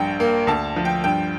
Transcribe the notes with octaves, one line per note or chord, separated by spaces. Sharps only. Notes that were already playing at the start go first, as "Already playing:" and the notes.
Already playing: A#1 G2 G5
A#3
D2 A5
F3
G5
G2 G5